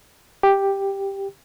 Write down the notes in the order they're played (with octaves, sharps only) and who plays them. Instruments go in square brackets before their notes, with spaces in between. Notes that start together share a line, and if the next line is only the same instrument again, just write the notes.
[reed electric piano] G4